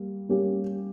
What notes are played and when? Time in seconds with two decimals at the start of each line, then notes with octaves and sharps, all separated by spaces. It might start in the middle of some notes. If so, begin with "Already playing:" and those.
Already playing: G3 A#3
0.29 G3 A#3 C#4 G4